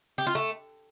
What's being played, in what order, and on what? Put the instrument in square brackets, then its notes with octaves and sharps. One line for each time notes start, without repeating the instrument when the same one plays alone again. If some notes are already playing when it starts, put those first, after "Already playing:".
[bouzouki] G4
F4
A3